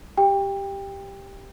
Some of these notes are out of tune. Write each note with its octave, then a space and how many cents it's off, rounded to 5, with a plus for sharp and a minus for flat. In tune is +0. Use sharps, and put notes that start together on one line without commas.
G4 +0 G5 +25